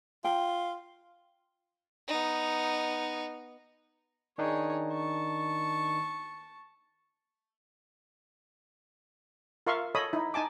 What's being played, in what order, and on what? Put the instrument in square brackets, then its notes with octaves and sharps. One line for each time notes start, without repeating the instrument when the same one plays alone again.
[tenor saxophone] F4 [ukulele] G5
[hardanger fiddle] B3 D#4
[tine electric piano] D#3 D4 D#4 [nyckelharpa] G#4 C#5
[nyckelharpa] A5 C#6
[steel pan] F4 A#4 E5 F5 C6 C#6
A4 C#5 D#5 B5 D#6
D#4 E4
D#4 G#5 A5 D6